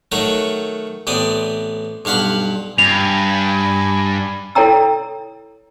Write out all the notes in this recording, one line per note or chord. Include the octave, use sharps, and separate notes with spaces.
D#3 F#3 A3 F#4 C#5 A#5
A1 B3 C4 D5 D#6
B1 G2 F5 F#5 B5
G2 G#5 B5 F7
E4 A4 C#5 G5 A#5 E6